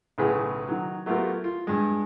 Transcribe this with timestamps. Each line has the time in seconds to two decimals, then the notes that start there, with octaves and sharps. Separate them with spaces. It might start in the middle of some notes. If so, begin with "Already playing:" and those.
0.18 B1 A2 C#3 G#4 B4
0.68 D#3 F#3
1.06 F#3 A3 B3 F4 G4 A#4
1.44 F4
1.67 G2 G#3